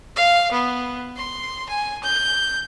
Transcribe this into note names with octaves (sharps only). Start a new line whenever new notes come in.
F5
B3
C6
G#5
G6